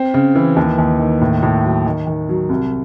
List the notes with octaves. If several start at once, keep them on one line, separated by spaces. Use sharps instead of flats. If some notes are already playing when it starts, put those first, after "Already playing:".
Already playing: C4
C#3
E3
D#2
D#2
D#3
A2
A2
F#3
D#3
D#3
F#3
C2